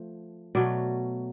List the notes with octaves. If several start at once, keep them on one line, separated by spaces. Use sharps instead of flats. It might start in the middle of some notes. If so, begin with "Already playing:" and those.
Already playing: F3 A3
B2 F#3 A3 D5